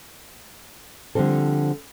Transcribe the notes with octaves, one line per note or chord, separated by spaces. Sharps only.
D3 F3 G3 C4 A4